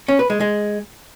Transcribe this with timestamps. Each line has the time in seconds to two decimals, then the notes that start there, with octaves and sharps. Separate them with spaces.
0.08 C#4
0.19 B4
0.30 G#3
0.40 G#3